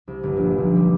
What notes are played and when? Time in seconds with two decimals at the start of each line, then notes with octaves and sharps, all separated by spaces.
0.08 C2
0.23 G1
0.37 A#1
0.58 B1
0.76 G3